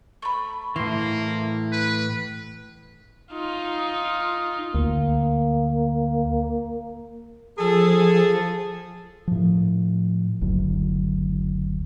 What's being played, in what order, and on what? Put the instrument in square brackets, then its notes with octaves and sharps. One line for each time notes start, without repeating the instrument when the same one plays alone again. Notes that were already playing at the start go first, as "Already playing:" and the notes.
[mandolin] A3 B5
[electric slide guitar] A2 E3 [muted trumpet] A#3 [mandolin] C6
[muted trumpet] B4
[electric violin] D#4 F4
[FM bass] D2 [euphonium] A#3
[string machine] F3 [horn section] G#4 A4
[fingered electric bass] A2 F3
F#1 D2 F#3